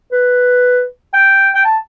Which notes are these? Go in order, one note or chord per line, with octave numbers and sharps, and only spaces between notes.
B4
G5
G5
A5